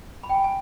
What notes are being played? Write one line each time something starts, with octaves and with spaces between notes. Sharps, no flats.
B5
G5
G#5
G#5